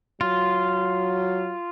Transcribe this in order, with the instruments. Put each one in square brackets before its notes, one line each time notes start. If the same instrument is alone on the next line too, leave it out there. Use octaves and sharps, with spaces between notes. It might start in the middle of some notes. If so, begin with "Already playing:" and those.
[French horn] F#3 [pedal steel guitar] F4